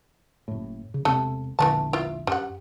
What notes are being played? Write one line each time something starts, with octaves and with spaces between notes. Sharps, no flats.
F#1 A2
C#3
E1 C3 A3 C4 A4
E1 A#1 D3 E3 A3 A5
E4 F4
F#2 G3 F#5